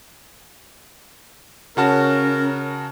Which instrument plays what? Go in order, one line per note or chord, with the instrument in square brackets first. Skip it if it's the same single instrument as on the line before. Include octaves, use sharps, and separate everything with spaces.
[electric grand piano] C#3 F#4 A5 [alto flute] C#4 [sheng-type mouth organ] A#4